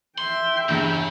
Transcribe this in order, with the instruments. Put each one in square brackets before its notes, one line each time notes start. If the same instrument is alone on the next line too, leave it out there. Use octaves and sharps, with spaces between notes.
[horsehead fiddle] E5 G5 [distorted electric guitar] C6
[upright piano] E2 G2 [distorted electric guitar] C#3